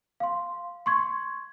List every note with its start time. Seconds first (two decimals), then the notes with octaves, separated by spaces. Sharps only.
0.20 F5 C6
0.86 C6 C#6 G#6